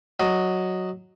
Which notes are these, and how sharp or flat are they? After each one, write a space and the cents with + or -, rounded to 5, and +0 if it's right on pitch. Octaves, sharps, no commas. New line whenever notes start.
F#3 +0 D#5 +0